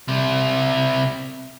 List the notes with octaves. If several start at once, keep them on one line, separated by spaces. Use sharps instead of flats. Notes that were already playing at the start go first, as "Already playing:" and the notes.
C3 E4